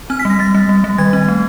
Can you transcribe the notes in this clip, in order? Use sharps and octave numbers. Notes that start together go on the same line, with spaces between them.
C4 F6
B6
G3 A#6
G3 A6
G3
G3
G3
D#3 G#6
C4
A3